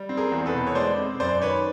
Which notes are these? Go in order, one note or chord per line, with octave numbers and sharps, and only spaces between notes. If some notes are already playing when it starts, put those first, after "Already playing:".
Already playing: G3
C4
G#4 A#4
E2
A4 B4
B2
C#5
G#3 C5 D5
C4
F#2 C5 D5
D#3 B4 C#5